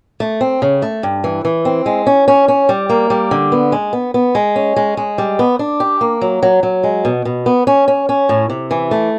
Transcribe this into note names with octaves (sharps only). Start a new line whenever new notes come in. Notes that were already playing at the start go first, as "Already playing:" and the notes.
A3
C4
C#3
A3
G2
E3
E3
C4
G#3
C#4
C#4
C#4
G3
A#3
G3
D3
B3
G#3
B3
B3
G#3
C#4
G#3
G#3
G3
B3
D4
G4
A#3
F#3
F#3
F#3
G#3
B2
B2
B3
C#4
C#4
C#4
A2
C3
E3
A3